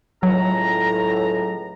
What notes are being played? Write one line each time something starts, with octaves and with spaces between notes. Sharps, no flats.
C#2 A2 F#3 A#5